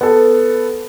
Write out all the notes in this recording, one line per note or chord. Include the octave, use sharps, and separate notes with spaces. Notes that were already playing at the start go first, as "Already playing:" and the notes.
B3 A4